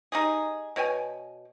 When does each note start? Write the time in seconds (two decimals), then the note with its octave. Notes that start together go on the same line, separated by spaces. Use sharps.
0.12 D#4 G4 G#4
0.76 B2 C#5 G5 G#5